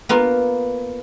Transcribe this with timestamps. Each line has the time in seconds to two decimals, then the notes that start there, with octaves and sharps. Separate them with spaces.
0.09 A#3 B3 F4